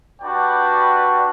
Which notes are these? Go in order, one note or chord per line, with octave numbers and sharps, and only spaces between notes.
G3 D4 F#4 B4 D5 G5